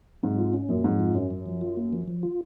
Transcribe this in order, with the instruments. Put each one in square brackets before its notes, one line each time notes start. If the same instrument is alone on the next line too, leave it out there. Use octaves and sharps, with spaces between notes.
[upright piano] G#2 C3 [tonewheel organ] F#3
[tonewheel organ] F4
C#4
[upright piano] F#2 A#2 [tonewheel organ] F#3
[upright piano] F2 G#2 [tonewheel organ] F#3
[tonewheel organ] F4
[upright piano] F#2 [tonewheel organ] C#4
[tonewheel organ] F#3
F3
F4
A#3
F3
F3
F4